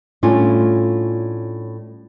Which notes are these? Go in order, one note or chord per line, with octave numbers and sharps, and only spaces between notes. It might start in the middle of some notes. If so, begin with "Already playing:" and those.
A2 G3 C#4 D4 F4